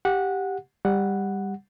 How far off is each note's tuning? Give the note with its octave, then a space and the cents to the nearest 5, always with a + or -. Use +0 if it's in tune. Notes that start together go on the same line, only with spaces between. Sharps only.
G4 +0 F#5 -15
G3 +15 F#5 +0